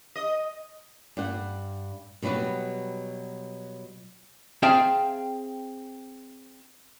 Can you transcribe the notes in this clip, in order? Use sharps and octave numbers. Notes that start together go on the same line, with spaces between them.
D#5
G2 F#5
B2 F#3 G3 B3 F#4
C4 G#4 E5 F5 G5 A5